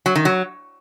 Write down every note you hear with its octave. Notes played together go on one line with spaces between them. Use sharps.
F#3
D#3
F#3